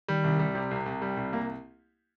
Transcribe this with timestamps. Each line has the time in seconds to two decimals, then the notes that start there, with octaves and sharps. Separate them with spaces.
0.08 D#3 G3
0.24 C2
0.39 G3
0.55 C3
0.71 C2
0.86 C2
1.02 G3
1.17 C2
1.33 A#3